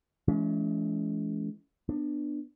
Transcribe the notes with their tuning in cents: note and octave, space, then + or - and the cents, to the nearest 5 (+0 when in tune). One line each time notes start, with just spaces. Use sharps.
E3 +15 G#3 +40 C#4 +40
B3 +0 D4 +15